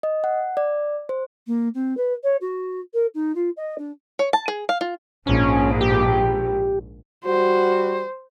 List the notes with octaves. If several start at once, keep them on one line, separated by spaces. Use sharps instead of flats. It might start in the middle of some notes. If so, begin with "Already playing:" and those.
D#5
F#5
D5
C5
A#3
C4
B4
C#5
F#4
A#4
D#4
F4
D#5
D4
C#5
A5
G#4
F5
F4
A#1 G#2 C#4
G4
G3 F#4 C5